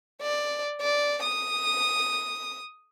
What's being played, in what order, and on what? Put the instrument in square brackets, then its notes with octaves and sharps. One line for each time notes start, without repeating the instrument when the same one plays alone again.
[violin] D5
D5
D#6